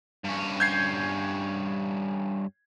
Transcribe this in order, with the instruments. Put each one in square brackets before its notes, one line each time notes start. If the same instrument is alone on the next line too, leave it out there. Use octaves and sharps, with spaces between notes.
[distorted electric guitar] G2 C#4
[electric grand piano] G6 G#6 C7